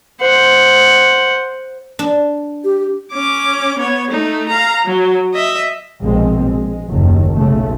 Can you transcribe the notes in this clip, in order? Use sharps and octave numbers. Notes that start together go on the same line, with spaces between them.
C5 F#5
D4
G4
C#4 D6
B3 C#5
A3 D#4
F5 A#5
F#3
D#5 E5
A#1 B2 G#3 C4
G#3
F#1 D#2 D#3
B1 C#3 A3